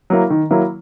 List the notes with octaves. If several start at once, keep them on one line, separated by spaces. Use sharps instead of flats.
F#3 A#3 E4
D#3
F#3 A#3 E4